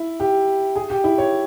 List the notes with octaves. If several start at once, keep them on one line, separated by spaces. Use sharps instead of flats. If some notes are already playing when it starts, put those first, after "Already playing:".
Already playing: E4
G4
G#4
G4
E4
C#5